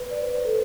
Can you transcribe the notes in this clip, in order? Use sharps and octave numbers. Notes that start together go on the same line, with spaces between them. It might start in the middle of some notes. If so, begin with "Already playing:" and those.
Already playing: B4
D5
C5
B4
A4